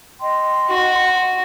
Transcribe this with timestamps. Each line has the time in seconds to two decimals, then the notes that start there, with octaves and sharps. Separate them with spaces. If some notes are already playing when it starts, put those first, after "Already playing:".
0.20 D#5 G5 C6
0.70 F#4